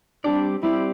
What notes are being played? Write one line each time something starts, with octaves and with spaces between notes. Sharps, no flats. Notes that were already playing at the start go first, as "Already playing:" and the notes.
G3 C4 D4 G4 D5
G3 C4 E4 G4 D5